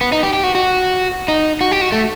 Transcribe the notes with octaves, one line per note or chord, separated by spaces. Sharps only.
B3
D#4
G4
G4
F#4
F#4
D#4
F#4
G4
F#4
A3